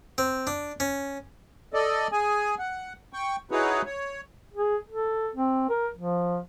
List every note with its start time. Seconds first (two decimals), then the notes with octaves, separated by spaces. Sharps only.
0.18 C4
0.47 D4
0.80 C#4
1.74 A4 D5 D#5
2.12 G#4 G#5
2.59 F#5
3.13 G5 C#6
3.51 D#4 E4 F#4 G#4 B4 C#5
3.86 C#5
4.54 G#4
4.89 A4
5.35 C4
5.70 A#4
5.96 F3